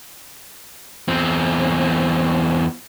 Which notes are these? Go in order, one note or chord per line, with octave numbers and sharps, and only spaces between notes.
E2 C4